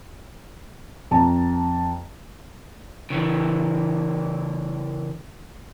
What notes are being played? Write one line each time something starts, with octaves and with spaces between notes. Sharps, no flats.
F2 A5 A#5
C#3 E3